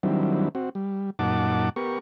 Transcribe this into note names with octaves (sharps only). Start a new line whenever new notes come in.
D#3 F#3 G3 C4 D4 E4
C4 F#4
G3
F#2 A#2 D#4 F#5 A5 D6
B3 G4 A#4 C#6